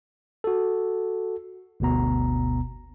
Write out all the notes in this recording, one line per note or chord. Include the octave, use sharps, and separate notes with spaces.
F#4 A4
G1 D2 B2 B3 A#5